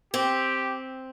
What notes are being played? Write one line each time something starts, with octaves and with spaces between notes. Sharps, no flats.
C4 G4